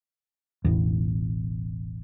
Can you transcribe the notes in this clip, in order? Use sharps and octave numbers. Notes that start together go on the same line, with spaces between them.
E1 A1 E2